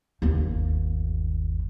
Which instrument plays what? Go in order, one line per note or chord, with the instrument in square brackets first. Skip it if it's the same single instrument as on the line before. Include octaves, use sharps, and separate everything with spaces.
[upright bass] G1 D#2